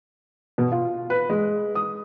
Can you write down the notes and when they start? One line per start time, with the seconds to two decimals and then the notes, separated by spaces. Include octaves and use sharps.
0.58 B2
0.72 F4
1.10 B4
1.30 G#3
1.75 D#6